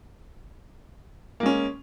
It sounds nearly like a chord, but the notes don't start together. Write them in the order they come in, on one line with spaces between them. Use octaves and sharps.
A#3 G#3 C#4